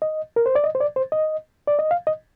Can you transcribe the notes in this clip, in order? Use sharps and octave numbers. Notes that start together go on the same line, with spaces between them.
D#5
A#4
C5
D5
D#5
C5
D5
C5
D#5
D5
D#5
F5
D#5